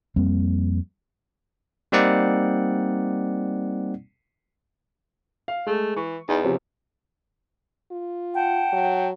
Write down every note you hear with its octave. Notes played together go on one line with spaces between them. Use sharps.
F2 G3 A#3 C4
G3 A#3 C4 D#4 D5 F#5
F5
G#3 A3
E3 C#6
E2 D#4
C3 F3 C#4
F4
F#5 G5 A5
F#3